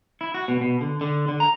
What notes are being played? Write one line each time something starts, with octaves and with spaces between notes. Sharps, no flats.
E4
F#4
B2
B2
D3
D3
D3
A#5